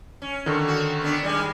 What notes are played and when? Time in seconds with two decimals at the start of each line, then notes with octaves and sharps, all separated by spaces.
0.22 C#4
0.46 D3 D#3
0.68 F#4
1.02 B3 D4
1.23 D#3 G3 G#3